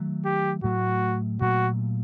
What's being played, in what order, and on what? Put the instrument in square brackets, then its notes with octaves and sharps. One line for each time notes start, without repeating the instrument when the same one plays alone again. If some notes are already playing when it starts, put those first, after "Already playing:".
Already playing: [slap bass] D#3 F#3 A3
[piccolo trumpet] G4
[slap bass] A2 F#3 A3 [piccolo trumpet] F#4
[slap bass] A#2 F#3 A3 [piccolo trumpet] F#4